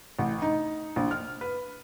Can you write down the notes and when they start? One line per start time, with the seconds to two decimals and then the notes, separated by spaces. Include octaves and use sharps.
0.19 A1
0.42 D#4
0.96 A#1
1.11 F6
1.41 B4